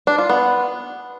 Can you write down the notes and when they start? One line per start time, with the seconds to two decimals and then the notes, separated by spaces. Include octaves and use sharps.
0.07 D4
0.18 F4
0.30 B3